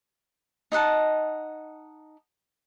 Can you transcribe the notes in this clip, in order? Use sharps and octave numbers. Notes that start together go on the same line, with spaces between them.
D#4 D#5 F#5 A5